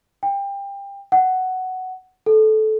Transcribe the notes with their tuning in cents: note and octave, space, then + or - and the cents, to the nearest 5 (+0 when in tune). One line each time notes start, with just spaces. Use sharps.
G5 +25
F#5 +10
A4 -20